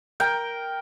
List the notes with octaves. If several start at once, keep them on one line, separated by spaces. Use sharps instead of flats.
A#4 G5